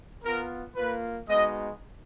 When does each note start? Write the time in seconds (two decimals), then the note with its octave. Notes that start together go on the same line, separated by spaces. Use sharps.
0.24 B3 F4 A#4
0.76 A#3 F4 B4
1.28 G#3 B3 D#4 F#4 D#5